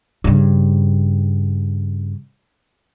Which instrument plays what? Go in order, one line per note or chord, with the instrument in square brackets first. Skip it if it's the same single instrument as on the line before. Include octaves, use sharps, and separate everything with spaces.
[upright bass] G2 C#3